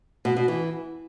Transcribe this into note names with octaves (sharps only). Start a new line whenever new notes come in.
B2
B2
E3